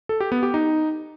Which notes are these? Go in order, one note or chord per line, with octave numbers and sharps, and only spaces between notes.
A4
G4
B3
G4
D#4